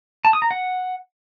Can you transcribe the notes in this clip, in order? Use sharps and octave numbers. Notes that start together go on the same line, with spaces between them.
A5
D#6
A#5
F#5